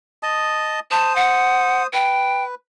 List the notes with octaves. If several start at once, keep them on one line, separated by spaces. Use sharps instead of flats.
D#5 A5 D#6
C5 A5 D#6
F#5
B4 G5